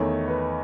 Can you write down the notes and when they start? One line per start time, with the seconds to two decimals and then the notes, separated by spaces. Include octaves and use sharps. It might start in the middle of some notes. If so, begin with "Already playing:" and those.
Already playing: E2 D#3 A3 C#5
0.28 B4